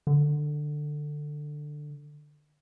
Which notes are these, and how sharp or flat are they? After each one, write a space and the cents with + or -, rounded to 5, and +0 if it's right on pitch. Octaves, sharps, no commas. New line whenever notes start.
D3 +15